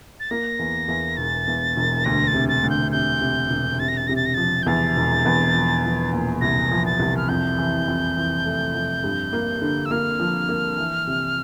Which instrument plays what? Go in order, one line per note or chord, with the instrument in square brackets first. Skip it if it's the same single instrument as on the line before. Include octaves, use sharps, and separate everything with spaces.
[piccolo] A6
[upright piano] A#3 [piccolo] A#6
[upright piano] E2
E2
[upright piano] E1 [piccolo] A6
[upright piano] E2
E1
[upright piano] D2 [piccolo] A#6
[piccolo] A6
[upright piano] C3
[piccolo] A6
[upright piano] D2
[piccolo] G6
[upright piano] C3 [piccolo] G6
[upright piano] C3
E1
[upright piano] C3 [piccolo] A6
[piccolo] A#6
A6
[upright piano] C3 [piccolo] A#6
[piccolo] A6
A#6
[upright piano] F3 [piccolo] A6
[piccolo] G6
[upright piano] E2 [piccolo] A6
[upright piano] E1
E2
F3
F3
A#2
[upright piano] C2 [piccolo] A#6
[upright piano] F3
[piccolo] A6
[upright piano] C2
[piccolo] F6
[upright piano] F2 [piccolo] G6
[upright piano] E3
F2
E3
A3
F2
G2
A#3
D3
[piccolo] E6
[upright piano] A#3 [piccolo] F6
[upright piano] F3
A#3
E3
C3